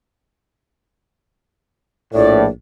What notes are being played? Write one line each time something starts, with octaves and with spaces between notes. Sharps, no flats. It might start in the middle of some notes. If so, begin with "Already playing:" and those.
A#1 A2 D5